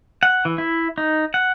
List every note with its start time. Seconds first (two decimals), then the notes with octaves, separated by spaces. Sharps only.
0.23 F#5
0.45 E3
0.58 E4
0.98 D#4
1.34 F#5